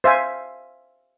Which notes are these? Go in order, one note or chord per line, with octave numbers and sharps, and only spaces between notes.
C5 E5 F5 G#5